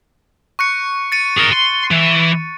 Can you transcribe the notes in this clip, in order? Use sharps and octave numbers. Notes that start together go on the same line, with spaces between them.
C#6 F#6 C#7
A6 C#7 D#7
G#4 A#4
C6
E3